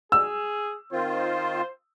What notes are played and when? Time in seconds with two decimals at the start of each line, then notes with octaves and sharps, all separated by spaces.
0.12 G#4 E6
0.93 D#3 C4 F4 C5